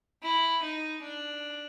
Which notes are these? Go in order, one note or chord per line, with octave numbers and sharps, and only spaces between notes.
E4
D#4
D4